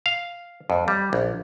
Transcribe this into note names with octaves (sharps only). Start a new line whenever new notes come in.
F5
F2
G3
A#1